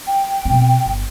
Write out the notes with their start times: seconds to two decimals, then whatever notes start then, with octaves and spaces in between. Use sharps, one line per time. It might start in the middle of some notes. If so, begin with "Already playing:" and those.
0.07 G5
0.45 B2 C4
0.85 G1